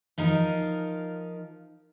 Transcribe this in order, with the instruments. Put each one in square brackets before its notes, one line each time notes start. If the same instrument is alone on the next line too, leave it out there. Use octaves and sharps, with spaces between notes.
[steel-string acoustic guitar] F3 D#4 F4 A#4